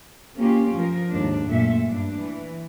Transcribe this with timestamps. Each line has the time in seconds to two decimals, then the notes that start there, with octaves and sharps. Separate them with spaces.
0.36 A#3 C#4 F4 G4
0.75 F3 A#4
1.10 D#2 G#2 D4
1.47 F#2 A#2 A3 A4 E5
1.87 G2 D4
2.19 E3